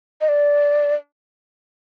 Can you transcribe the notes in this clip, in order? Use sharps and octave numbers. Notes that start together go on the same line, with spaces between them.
D#5
D5